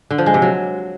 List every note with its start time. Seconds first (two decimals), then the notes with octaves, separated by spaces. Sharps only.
0.10 D3
0.18 F3
0.26 G#3
0.34 C3
0.42 F#3